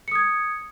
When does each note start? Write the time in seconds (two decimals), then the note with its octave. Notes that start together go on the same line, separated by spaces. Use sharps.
0.08 C#7
0.12 D#6
0.15 G#6